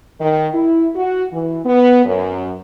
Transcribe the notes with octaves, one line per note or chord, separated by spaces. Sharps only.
D#3
E4
F#4
E3
B3
F#2